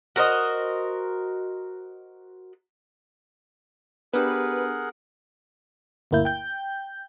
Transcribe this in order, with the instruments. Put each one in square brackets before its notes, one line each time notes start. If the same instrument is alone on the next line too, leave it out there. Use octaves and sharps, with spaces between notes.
[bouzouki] F#4 A#4 C5 D#5
[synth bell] B3 D4 G4 [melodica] G#4 A#4 F#5 [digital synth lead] B4
[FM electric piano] G1 D2 A#3 E4 G6
G5 G6